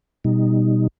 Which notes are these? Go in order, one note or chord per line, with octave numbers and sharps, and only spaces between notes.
B2 G3 D#4